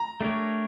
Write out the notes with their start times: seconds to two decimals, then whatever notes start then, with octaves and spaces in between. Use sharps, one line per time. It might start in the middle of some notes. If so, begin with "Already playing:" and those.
Already playing: A#5
0.21 A3 D4 G4 A#4 C#5